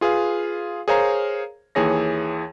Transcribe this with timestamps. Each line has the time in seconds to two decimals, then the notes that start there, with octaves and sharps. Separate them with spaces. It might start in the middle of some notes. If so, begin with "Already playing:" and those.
0.01 F4 G#4 B4 F5
0.88 G#4 A#4 C5 C#5 F5 A#5
1.75 D#2 E3 G#4 C#5 A#6